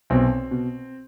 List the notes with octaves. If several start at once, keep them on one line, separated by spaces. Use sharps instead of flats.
B1 B2 C4
B2